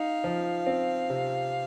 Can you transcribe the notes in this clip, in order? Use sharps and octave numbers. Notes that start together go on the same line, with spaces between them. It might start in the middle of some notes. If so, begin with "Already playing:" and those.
Already playing: D#4 F5
F3
C4
C3